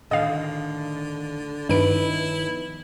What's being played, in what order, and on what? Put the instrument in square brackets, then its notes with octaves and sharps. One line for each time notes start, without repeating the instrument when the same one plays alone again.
[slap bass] A2 D#3 [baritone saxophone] D3 [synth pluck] D#5 F5
[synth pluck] G2 D7 [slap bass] D#3 F3 B3 [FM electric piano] D#4 B4 [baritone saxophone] E4